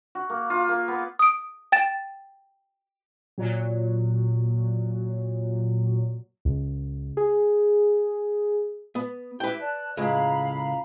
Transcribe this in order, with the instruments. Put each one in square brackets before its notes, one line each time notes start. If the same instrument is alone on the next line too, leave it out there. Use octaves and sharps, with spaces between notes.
[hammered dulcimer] F#4
A#3
F4
A#3
B3
[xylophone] D#6 D7
G5 A6 E7
[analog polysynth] A#2 F#3
[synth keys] C#2
G#4
[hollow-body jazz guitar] B3
[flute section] E4 G4 [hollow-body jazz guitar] B4 G5
[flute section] D5 A5 F#6
[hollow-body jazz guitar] C#2 A2 G#3 [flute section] F5 A#5 B5